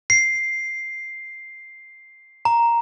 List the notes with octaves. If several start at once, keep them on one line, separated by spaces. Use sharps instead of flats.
C7
A#5